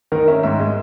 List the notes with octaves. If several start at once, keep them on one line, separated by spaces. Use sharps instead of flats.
D#3 A#4
C#4 E5
G#2 E5
G#3